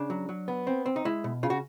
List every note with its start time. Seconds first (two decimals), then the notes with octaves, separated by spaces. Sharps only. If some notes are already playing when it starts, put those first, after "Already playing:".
Already playing: C#3 D4
0.10 F#3
0.29 F#3
0.48 B3
0.67 C4
0.86 C4
0.96 D#4
1.05 G#3 E4
1.24 B2
1.43 C#3 F4
1.50 F#4